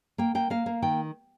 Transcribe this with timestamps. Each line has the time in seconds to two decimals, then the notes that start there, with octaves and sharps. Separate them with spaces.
0.18 A#3 G5
0.35 A#3 G5
0.50 A#3 F5
0.66 A#3
0.82 D#3 G5